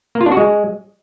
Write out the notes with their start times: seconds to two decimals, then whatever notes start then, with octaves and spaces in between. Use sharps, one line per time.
0.15 A#3
0.21 F4
0.26 D4
0.32 F#4
0.37 G#3